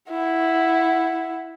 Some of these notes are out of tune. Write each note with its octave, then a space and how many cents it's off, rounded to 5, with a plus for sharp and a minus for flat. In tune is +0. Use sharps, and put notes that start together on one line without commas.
E4 +0 F#5 +0